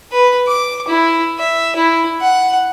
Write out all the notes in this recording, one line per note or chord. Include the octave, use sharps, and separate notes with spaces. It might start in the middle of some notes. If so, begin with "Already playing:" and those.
B4
D6
E4
E5
E4
F#5